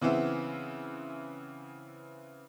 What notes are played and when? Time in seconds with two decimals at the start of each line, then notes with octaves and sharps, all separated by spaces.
0.01 C#3 E3 B3 C4 E4